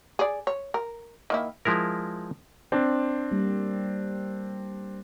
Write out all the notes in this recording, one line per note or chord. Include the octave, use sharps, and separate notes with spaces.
G#4 D5
C#5
A#4
D#3 A#3 E4
F3 G#3 E4 A#4
C4 D4
G3 A#3